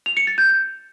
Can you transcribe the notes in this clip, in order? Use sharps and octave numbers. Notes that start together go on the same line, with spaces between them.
F7
C#7
A6
G6